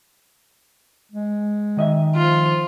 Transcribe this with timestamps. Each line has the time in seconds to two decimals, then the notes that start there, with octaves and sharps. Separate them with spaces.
1.12 G#3
1.77 D#3 D#5 E5
2.15 F3 F4